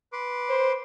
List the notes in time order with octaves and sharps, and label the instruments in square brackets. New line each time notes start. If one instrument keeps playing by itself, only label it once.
[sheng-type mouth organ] B4 C6 D6
[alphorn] C5